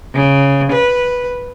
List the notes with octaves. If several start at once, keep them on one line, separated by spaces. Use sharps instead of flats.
C#3
B4